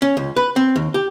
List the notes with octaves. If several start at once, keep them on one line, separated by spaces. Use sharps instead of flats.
C#4
C#2
B4
C4
D#2
G4